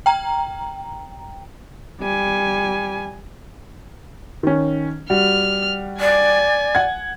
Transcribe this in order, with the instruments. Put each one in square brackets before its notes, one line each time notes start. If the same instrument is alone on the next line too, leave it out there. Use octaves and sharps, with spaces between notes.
[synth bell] G5 A#5
[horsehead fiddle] G3 G#5
[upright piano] D#3 C#4
[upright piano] G3 F#4 [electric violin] F6
[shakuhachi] D5 [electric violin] G#5
[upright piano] F#5 G#6